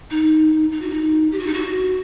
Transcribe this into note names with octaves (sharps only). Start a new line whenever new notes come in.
D#4
D#4
F#4
D#4
G4
F#4
D#4
F#4